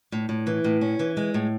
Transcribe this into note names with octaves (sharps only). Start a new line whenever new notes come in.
A2
A2
E3
A2
C#4
E3
G#3
A2